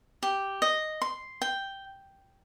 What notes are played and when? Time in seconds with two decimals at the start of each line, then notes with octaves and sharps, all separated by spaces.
0.23 G4
0.62 D#5
1.02 C6
1.42 G5